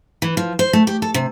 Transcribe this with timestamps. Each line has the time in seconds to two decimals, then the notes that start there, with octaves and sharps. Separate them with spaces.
0.22 E3
0.37 F3
0.59 C5
0.73 A3
0.87 G4
1.02 A4
1.14 C3